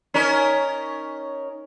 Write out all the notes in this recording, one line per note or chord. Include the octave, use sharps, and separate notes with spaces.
C#4 D#4 A#4